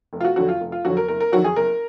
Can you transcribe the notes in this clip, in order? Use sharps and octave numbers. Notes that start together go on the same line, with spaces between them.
F1
F4
F#4
F2 D3 F#3 F#4
F4
F1
F4
F2 D3 F#3 F#4
A#4
F#1 A#4
A#4
F2 D#3 F#3 F#4
G#4
F#1 A#4